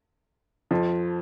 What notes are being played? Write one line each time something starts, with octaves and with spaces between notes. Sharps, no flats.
F2 F3